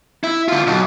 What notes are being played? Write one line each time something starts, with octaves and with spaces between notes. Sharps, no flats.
E4
D3 F4
B1